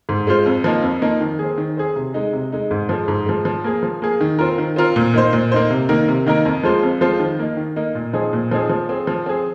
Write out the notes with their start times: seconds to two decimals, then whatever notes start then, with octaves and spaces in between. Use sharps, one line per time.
0.09 G#2
0.27 G#3 F4 C5
0.46 F2
0.64 F3 A#3 D#4
0.83 F2
1.02 F3 A#3 D#4
1.21 D#3
1.39 C4 G#4
1.58 D#3
1.77 C4 G#4
1.96 C3
2.14 G#3 D#4
2.33 C3
2.52 G#3 D#4
2.71 G#2
2.89 F3 G#3
3.08 G#2
3.26 F3 G#3
3.45 F3
3.64 A#3 G#4
3.83 F3
4.02 A#3 G#4
4.21 D#3
4.39 C4 F4 A#4
4.58 D#3
4.76 C4 F4 A#4
4.96 A#2
5.14 A#3 D#4 C5
5.33 A#2
5.52 A#3 D#4 C5
5.70 C3
5.89 D#3 A#3 D#4 A#4
6.08 C3
6.26 D#3 A#3 D#4 A#4
6.45 F2
6.64 F3 G#3 F4 C5
6.83 F2
7.01 F3 G#3 F4 C5
7.19 D#3
7.39 A#3 D#4
7.57 D#3
7.76 A#3 D#4
7.95 A#2
8.13 F3 C4 D#4 G#4
8.33 A#2
8.51 F3 C4 D#4 G#4
8.69 F3
8.89 C4 G#4
9.07 F3
9.26 C4 G#4